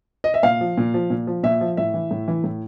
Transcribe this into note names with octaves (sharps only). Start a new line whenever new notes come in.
D#5
E5
A#2 F5
F3
A#2
F3
A#2
F3
A#2 E5
F3
A2 E5
E3
A2
E3
A2